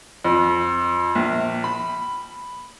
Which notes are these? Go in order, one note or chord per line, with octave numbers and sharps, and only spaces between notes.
F2
A#1
B5